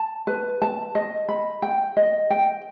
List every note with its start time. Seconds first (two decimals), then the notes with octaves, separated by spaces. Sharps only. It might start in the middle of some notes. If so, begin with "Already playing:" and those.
Already playing: A5
0.27 B4
0.62 A5
0.95 D#5
1.29 B5
1.62 G5
1.97 D#5
2.30 G5